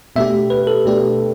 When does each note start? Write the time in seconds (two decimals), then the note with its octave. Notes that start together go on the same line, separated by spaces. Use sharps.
0.16 B2 A3 D4 G4 E5
0.50 B4
0.67 A4
0.85 B2 A3 D4 G4